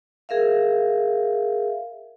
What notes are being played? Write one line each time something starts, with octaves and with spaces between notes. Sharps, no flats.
G#4 A#4 E5 F5